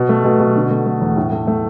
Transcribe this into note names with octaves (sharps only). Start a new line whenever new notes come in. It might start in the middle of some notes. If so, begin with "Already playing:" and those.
Already playing: B2
A3
B2
B2
D3
A3
A3
E2
A2
A3
A3